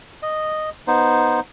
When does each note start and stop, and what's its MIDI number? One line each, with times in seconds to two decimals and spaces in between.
0.23 0.70 75
0.87 1.40 59
0.87 1.40 63
0.87 1.40 72